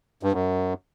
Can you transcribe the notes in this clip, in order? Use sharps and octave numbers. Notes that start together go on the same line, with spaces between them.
G2
F#2